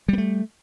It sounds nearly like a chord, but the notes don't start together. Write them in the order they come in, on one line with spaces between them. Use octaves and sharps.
G3 B3 A3